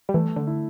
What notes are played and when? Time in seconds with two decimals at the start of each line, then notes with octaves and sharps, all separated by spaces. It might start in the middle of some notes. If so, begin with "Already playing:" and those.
0.09 G3
0.14 E3 A3
0.36 D3
0.47 E4